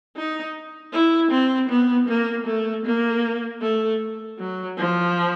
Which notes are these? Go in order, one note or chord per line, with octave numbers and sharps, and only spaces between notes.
D#4
E4
C4
B3
A#3
A3
A#3
A3
F#3
F3